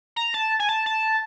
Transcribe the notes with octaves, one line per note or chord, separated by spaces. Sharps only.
A#5
A5
G#5
A5
A5